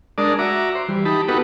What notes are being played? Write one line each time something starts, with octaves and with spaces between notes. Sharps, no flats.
G#3 D4 A#4 D5 A5 D#6
F#4 E5 A#5 D6
C5
E3 G3
D#4 G4 A5 B5
B3 D#4 F#4 G4 A4 B4